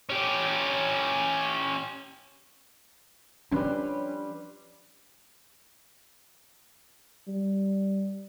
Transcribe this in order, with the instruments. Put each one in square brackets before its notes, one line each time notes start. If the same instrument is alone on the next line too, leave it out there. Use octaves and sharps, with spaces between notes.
[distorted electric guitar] C#4 G4
[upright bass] F3 D4 [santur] G3 B4 C6 [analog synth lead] C#4
[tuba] G3